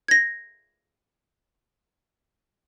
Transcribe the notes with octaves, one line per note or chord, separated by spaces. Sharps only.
G#6 A#6